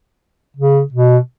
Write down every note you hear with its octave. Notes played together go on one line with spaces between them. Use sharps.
C#3
B2